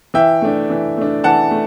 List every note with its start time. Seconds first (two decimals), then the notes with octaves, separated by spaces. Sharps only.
0.14 E3 E5 G5
0.42 A3 D4
0.70 E3
0.97 A3 D4
1.24 E3 F#5 A5
1.51 A3